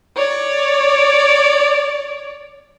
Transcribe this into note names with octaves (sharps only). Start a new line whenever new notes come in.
C#5 D5